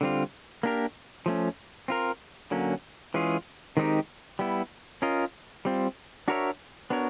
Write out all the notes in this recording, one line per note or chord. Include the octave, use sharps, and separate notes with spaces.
D3 G3 C4 F4
A#3 D4 G4 A#4
F3 A3 C#4
C4 F4 A#4
D3 F#3 A#3 C#4
E3 G#3 C#4 F4 G#4
D#3 G#3 C4 D#4 G4
G3 B3 E4
C#4 F4 A#4 D#5
G3 C4 F4
D4 F#4 A#4 C#5 E5
B3 D4 F#4 A#4 C#5